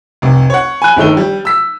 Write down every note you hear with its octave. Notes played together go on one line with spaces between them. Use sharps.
F1 C2
C#5 F#5
G#5 B5 F#6 D#7
G1 D#3 A3 G7
G3
E6 B6